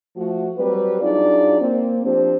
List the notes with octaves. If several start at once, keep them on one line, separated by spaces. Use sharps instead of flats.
F3 A3 F#4
F#3 G3 C4 B4
F#3 D4 D#4 F4 G#4 D5
A#3 C4
F3 C4 D4 G4 C5